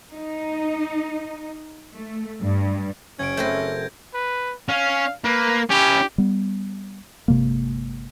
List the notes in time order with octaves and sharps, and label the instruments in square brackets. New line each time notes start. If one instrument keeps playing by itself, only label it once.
[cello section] D#4
A3
G2
[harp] F#1 [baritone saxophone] C#4 [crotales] G#6 D7
[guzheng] A3 C4 B4 [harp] A#4 [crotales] G6 A#6
[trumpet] B4
[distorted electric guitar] C#4 [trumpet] F5
[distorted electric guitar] A#3 [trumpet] B4
[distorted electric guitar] C#4 E4 [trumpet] G4
[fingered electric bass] G3 B3
G1 C3 G#3 A#3